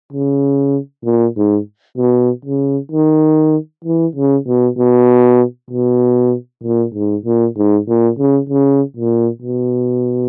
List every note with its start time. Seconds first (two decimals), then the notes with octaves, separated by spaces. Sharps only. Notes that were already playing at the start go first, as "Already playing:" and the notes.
0.13 C#3
1.05 A#2
1.37 G#2
1.98 B2
2.45 C#3
2.92 D#3
3.85 E3
4.15 C#3
4.47 B2
4.78 B2
5.70 B2
6.64 A#2
6.95 G#2
7.25 A#2
7.57 G#2
7.88 A#2
8.19 C#3
8.49 C#3
8.96 A#2
9.42 B2